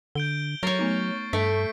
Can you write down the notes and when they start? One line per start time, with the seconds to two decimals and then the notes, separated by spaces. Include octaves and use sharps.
0.15 D3 G6 D7 G7
0.63 F#3 A#4 C#5 C#6 A6 C7
0.79 A3 B3 D#4
1.33 G2 A3 E5 B6 C#7 D7